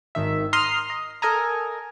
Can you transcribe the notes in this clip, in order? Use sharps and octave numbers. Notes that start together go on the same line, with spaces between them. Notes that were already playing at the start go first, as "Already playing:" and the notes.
G#1 D#3 E5
A#5 C6 D#6 F6 C7
D#5
A4 A#4 D#5 G#5 A#5